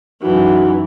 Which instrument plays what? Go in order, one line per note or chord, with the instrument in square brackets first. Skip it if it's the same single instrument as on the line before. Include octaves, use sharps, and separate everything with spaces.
[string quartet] F#2 E3 [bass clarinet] D#4 [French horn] F#4